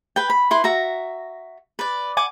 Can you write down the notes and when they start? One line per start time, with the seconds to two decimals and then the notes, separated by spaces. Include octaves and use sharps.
0.16 B4 G5
0.30 B5
0.51 E4 B4 C6
0.64 F#4 E5 A#5
1.79 B4 D5
2.17 F#5 G#5 D6